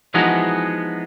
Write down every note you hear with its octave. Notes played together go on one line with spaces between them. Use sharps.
E3 F3 G#3 B3 D#4 F#4